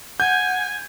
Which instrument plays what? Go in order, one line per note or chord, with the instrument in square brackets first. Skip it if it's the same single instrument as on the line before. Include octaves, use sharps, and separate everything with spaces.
[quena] F#5 [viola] G#5 [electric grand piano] G6